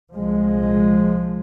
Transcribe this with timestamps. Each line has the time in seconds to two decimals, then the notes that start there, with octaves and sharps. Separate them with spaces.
0.14 C2 A#2 F3 G#3